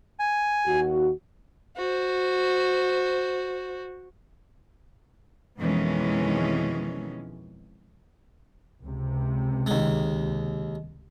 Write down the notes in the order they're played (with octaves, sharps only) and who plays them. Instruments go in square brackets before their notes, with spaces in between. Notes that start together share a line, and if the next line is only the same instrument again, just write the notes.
[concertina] G#5
[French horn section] D#2 F#4
[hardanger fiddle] F#4 C5
[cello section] F2 B2 D#3 E3 G#3 C#4
[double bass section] C#2 C3
[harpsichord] D#2 G#3